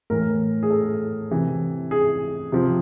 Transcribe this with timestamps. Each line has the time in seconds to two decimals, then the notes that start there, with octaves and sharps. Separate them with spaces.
0.10 A2 E3 A#4
0.63 G#4
0.70 A4
1.31 C3 E3
1.91 G#4
2.52 C3 F3